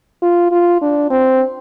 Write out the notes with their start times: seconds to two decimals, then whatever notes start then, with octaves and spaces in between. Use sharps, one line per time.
0.22 F4
0.52 F4
0.82 D4
1.10 C4